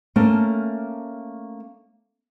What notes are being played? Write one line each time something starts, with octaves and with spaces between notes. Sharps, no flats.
A3 A#3 C#4 A#4 A5